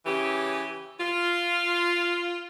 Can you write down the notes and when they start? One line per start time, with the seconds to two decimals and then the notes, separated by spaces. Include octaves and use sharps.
0.06 C#3 E3 C#4 G4
1.00 F4